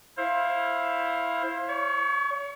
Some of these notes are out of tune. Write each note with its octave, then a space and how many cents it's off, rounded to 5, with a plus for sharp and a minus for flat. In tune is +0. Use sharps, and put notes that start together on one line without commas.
E4 +0 C5 +25 F5 +0
C#5 +40 C#6 +0